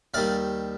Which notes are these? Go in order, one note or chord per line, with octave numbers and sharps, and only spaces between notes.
D#2 D#3 G3 D5 F5